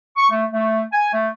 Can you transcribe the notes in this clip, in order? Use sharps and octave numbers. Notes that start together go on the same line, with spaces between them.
C#6
A3
A3
G#5
A3